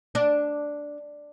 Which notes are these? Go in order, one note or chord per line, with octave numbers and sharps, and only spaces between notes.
D4